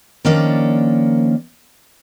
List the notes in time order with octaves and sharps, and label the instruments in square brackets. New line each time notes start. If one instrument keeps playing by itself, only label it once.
[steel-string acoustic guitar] D#3 F3 A#3 C#4 D4 D5